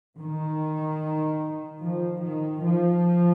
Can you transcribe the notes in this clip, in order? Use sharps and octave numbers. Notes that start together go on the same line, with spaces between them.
D#3
F3
D#3
F3